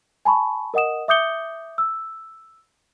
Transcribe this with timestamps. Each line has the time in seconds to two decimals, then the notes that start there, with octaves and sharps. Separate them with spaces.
0.25 G#5 A5 B5 C#6
0.74 A#4 D#5 F#5 D#6 E7
1.08 E5 D6 D#6 G6 C#7 G7
1.78 E6